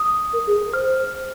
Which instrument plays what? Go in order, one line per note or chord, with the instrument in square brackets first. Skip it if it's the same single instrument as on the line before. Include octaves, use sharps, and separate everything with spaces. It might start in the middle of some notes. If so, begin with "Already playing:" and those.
Already playing: [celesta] D#6
[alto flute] A#4
G#4
[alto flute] C5 [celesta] F6